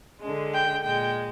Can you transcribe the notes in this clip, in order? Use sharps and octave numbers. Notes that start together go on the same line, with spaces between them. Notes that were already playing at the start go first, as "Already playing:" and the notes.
D3 G#3
G5
A#2 G#3 G5